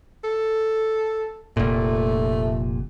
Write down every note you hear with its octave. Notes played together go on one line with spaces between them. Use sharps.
A4
F1 A#2 A3